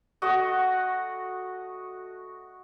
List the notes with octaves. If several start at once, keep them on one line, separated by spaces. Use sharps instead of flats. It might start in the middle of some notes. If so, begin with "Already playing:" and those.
A3 F#4 D#5